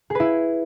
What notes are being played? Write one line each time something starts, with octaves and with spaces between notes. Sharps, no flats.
E4 G#4 B4